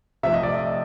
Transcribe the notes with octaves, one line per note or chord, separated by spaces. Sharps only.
C3 F3 A3 E5
D#5
D5
D#5